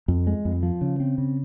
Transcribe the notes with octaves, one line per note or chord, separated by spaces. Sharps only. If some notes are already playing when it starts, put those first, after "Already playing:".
F2
G#3
F2
F3
C#3
C4
C#3